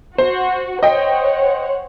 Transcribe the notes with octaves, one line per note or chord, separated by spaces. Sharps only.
F#4 C5
C5 C#5 D#5 F#5 G5